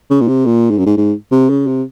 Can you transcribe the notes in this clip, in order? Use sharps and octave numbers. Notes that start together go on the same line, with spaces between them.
C#3
A#2
C3
A#2
G#2
F#2
G#2
G#2
C3
C#3
C3